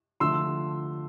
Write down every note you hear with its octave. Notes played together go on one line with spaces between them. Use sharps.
D3 F3 A3 C6 E6